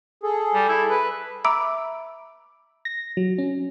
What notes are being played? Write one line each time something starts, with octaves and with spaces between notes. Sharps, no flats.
G#4 A4
G3
E4
B4
E5 A#5 B5 D6 E6 D7
A#6
F#3
C#4